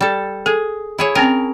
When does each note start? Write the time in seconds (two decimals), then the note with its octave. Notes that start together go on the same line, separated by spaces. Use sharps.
0.01 G3 A4
0.46 G#4 A4
0.98 E4 G#4 C#5
1.15 C4 C#4 A#4 G5